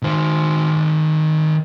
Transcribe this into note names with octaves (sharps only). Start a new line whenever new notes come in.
D#3 C5